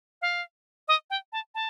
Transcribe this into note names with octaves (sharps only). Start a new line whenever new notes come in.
F5
D#5
G5
A5
A5